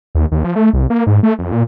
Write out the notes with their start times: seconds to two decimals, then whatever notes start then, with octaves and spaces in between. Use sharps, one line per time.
0.15 D#2
0.32 D#2
0.44 F3
0.56 A3
0.73 C2
0.90 A#3
1.07 G#2
1.23 A3
1.39 F2
1.52 A#2